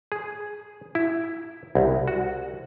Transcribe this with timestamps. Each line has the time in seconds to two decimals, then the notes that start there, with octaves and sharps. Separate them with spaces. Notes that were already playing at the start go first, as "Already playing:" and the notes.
0.12 G#4
0.95 E4
1.75 C2
2.08 F#4